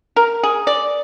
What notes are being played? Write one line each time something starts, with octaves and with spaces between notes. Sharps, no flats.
A#4
G#4
D5